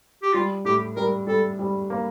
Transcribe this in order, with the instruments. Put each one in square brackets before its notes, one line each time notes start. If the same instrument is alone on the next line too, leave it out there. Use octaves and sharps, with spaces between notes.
[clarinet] G4
[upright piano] G3 [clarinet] F4
[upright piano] A2 [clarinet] G4
[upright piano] G3 [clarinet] A#4
[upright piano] G3 [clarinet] A4
[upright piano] G3
A#3